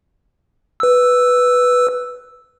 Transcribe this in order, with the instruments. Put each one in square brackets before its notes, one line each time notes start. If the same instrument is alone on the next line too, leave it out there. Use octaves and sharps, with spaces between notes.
[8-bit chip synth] B4 E6